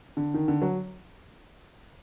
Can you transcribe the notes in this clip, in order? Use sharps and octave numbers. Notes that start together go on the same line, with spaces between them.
D3
D#3
D3
F#3